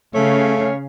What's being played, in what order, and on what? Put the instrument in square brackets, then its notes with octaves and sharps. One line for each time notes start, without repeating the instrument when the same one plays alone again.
[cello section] C#3 C#4 F5 [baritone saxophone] A3 [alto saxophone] C#5